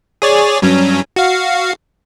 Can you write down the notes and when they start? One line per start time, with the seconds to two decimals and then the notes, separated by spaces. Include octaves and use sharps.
0.22 G#4 C#5 D5
0.62 G2 F#3 C#4
1.16 F#4 F5